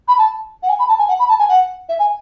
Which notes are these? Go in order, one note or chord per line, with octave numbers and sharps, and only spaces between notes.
B5
A5
F#5
G#5
B5
A5
G#5
F#5
B5
A5
G#5
F#5
E5
G#5